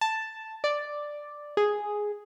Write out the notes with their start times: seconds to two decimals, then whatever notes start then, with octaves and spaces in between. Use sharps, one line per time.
0.01 A5
0.64 D5
1.57 G#4